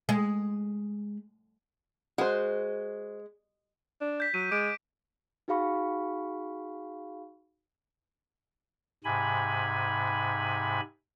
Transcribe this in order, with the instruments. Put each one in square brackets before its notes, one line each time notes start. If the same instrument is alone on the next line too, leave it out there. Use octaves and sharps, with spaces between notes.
[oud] G#3
[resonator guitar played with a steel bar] G#3 [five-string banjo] F#4 C5
[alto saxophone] D4
[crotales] G6 B6
[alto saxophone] F#3 [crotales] D#7
[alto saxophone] G#3 [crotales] D6 D7
[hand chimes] D#4 F#4 G#4 F5 B5 C#6
[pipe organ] G#2 C3 G#5 B5